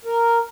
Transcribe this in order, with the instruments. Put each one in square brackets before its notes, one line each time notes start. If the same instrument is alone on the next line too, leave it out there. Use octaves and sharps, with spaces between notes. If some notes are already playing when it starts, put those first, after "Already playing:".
[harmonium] A#4